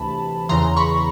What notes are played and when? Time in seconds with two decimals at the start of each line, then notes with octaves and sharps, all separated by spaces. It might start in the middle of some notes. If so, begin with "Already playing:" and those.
Already playing: D2 C3 E3 A5 B5
0.49 E2 C#3 E3 A#5 C6
0.77 B5 C#6